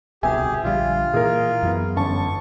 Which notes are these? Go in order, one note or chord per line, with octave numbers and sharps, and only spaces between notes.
D1 C2 B2 G4 G#4 E5 G#5
A#1 D3 G3 F4
A#2 E3 G#4 A#4
F#2 E3 B3
G1 C#4 A5 C#6